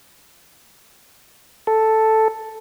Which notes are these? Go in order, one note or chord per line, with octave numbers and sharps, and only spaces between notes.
A4